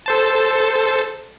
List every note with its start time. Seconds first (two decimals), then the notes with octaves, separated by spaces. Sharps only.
0.06 A4 C5 A5